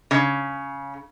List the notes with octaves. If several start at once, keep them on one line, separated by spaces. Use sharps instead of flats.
C#3